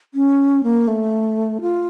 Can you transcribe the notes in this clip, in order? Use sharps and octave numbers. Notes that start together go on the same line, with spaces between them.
C#4
A#3
A3
F4